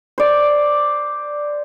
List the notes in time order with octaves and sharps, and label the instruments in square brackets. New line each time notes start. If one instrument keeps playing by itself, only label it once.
[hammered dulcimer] C5 D5